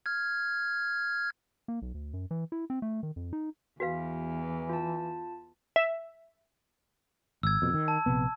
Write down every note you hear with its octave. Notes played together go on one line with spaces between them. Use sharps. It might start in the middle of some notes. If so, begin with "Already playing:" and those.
F6 G#6
A#3
B1
D2
F#2
E3
E4
C4
A3
D#3
F2
D#4
E2 E3 F#4 B4 F5
F4 A5
E5
G#1 E6 G#6
F2 B2
D#3
A5
A#1 C3 B3